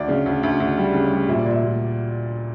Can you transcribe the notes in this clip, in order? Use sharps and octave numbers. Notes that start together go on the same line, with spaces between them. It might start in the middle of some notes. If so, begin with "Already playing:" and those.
Already playing: D2 D5
C#3
D2
D2
D2
G3
C#3
G3
A#2 E5
D5
A#2 E5
A#2